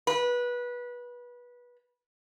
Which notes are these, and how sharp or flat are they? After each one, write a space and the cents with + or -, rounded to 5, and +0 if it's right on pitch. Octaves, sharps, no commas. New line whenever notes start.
B4 -20